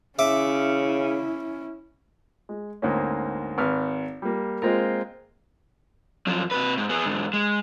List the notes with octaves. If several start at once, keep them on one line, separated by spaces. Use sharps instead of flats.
C#3 C#4 E4 E5 D6
G#3
D2 G#2 A#3 C4 C#4
G#1 B4 F6
G3 A#3
G#3 A#3 C4 F4 A#4
F#2 F3
C3 B4
G#2
B3 G#4
G#2 D3
G#3